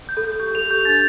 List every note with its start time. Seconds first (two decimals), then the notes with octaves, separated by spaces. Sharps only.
0.09 G6
0.17 A4
0.25 G6
0.40 G4 G6
0.55 A4 F7
0.71 G4 G6
0.85 D4 A6